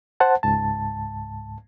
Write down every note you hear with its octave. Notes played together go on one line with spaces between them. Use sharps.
C5 F#5 A5
C#2 G#2 A5